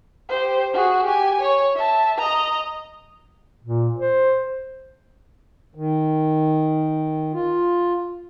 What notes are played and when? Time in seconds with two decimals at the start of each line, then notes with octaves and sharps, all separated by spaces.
0.29 G4 C5
0.73 F#4 G#4
1.05 G4 G#5
1.41 C#5
1.75 E5 A5
2.18 D#5 A#5
3.64 A#2
3.97 C5
5.75 D#3
7.34 F4